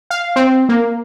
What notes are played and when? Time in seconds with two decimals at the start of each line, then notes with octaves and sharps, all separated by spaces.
0.10 F5
0.36 C4
0.69 A#3